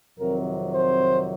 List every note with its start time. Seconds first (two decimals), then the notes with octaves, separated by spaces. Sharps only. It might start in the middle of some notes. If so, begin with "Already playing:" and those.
0.18 F2 C3 D#3 F#3 A#4
0.72 C5